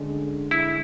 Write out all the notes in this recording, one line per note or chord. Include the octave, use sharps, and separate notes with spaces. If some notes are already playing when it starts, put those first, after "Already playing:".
Already playing: D3 G#3 C#4
E4